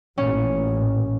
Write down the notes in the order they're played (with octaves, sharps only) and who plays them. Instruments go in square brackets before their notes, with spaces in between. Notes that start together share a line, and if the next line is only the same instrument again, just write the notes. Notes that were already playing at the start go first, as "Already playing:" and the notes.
[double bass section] A1 A#2 [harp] C#4